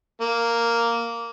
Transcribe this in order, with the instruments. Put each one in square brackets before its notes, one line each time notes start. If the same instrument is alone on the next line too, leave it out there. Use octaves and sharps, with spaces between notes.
[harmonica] A#3